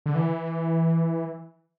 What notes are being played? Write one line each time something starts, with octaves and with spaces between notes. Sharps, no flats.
D3
E3